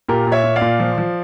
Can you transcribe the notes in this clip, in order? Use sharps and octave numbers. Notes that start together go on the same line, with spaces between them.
A#2 G4 A#4
A#2
C#5 E5
A#2
D5 F5
A#2
F3
F3